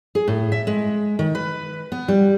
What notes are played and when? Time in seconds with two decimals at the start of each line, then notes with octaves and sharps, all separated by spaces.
0.15 G#4
0.28 A2
0.52 E5
0.67 G#3
1.19 D#3
1.35 B4
1.92 B3
2.08 G3